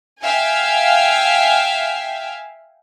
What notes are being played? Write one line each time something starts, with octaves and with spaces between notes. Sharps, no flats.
E5 F5 G5 G#5